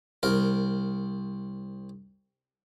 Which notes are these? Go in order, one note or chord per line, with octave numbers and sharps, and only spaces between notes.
C2 A#4